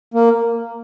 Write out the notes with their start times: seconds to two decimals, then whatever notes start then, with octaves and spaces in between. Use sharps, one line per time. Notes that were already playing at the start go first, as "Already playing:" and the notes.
0.14 A#3